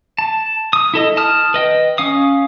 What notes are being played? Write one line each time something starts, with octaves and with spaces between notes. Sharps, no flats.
A5
D#6
E4 A4 D#5
A5 D#6 F6
B4 D#5 G5
C#4 F5 D#6